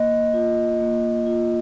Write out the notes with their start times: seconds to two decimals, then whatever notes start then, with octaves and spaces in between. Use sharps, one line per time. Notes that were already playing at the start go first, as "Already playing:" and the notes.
Already playing: A#3 D#5
0.33 F4
0.80 A#3
1.26 F4